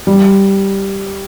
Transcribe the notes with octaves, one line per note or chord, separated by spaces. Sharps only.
G3